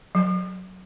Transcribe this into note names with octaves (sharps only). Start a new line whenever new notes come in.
F#3